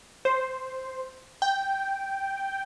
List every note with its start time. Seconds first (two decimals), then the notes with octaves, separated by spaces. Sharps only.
0.25 C5
1.42 G5